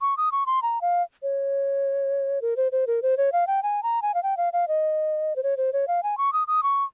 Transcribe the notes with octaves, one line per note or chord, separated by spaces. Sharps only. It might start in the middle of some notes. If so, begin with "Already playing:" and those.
C#6
D#6
C#6
C6
A#5
F5
C#5
A#4
C5
C5
A#4
C5
C#5
F5
G5
G#5
A#5
G#5
F5
G5
F5
F5
D#5
C5
C#5
C5
C#5
F5
G#5
C#6
D#6
D#6
C#6